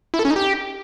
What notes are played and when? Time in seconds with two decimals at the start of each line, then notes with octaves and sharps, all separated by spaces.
0.14 E4
0.19 A4
0.25 C#4
0.30 D#4
0.36 G4